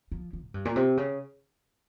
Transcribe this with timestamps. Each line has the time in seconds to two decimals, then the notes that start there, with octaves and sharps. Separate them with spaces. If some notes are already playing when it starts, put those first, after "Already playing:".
0.12 F3
0.33 F3
0.44 G#2
0.54 G2
0.65 A#2
0.76 C3
0.97 C#3